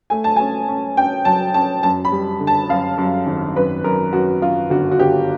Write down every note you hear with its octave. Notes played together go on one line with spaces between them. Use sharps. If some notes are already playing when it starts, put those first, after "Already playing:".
A3 G#5
A5
C#4 G#5
C#4
C#4 G5
F#3 A5
C#4 A5
F#2 A5
B5
G3
D3
A5
F#2 F5
F#2
G#1
F#2 B4
F#2 A#4
F#2 F#4
F#2 F4
G1 F#4
F#4
G1 G4